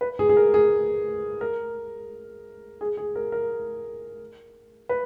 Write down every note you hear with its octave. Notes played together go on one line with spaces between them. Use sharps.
B4
G#4
G#4
A#4
G#4
A#4
G#4
G#4
A#4
A#4
B4